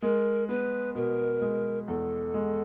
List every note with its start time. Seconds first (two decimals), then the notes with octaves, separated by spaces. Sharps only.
0.02 G#3 A#4
0.49 B3 B4
0.95 B2 A#4
1.42 G#3
1.88 E2 A4
2.34 G#3